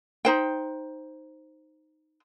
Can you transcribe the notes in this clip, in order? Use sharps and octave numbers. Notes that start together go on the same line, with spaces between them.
D#4 C5 G5